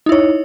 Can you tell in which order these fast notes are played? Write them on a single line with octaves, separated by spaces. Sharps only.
D#4 E4 C#5